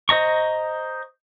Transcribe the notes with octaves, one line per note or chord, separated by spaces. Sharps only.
C5 D#5 A#5 C#6